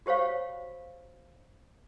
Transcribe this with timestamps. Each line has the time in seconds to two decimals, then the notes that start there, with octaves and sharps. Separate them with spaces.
0.06 F#4 G4 C5 C#5 F5